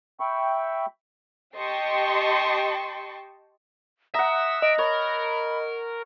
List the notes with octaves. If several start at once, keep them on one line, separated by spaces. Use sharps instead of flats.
E5 G5 B5 C#6
G4 D#5 G5 A5 C6 C#6
E5 F#5 A#5 D#6
D#5 D7
A#4 C#5 B5